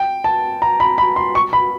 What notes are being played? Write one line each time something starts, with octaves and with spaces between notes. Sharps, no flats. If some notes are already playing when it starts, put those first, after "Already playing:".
Already playing: G5
A5
A#5
B5
B5
C6
C#6
B5